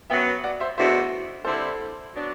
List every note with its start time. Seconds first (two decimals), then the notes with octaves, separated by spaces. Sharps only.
0.10 F#2 F#3 B3 E5 G5
0.44 D5 F#5
0.60 C5 E5
0.77 E2 B2 A3 D4 F#4 C5 E5
1.45 D3 G3 C4 E4 A4 C5
2.13 F#3 B3 D4